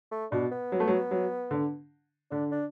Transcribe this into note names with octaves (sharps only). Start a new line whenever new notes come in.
A3
B2 D4
B3
F#3
A3
F#3
F#3
D3
D3 D4
D4